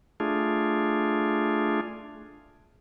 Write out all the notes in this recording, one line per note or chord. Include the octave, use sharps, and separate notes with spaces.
A3 D4 F4 G#4